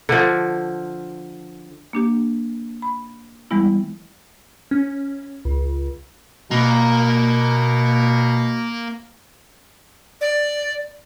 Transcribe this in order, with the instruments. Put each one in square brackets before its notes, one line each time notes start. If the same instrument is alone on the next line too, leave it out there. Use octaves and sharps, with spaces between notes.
[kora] D3 F3
[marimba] A#3 D4 G4
B5
E3 G3 G#3 B3 E4
[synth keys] C#4
C#2
[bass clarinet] B2 [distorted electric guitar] A#3
[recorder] D5